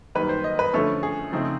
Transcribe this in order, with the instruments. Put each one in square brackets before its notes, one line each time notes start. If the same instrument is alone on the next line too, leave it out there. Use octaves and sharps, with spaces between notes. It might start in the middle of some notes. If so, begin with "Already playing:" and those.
[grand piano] F#2 D#3 G3 A#3 B4
C5
D#5
B4
D3 F3 A3 C#4 A4
G#4
C#3 F3 A3 C4 D#4